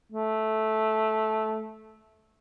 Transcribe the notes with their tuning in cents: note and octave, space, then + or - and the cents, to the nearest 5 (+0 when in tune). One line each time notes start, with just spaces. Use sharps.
A3 -10